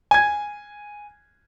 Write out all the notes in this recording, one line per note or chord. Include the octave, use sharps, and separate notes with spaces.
G#5 G#6